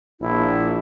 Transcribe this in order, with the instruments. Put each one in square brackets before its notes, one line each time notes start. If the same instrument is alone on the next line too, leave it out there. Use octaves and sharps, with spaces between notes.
[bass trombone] A#1 [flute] E4